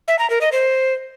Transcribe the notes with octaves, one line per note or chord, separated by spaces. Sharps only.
E5
A#5
A#4
D#5
C5